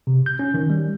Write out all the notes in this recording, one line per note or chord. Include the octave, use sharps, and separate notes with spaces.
C3
G6
C#4
D#3
G3